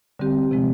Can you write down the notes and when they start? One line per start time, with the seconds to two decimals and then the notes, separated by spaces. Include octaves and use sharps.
0.19 D3 G3 C4 G4
0.51 C3 F3 G#3 C4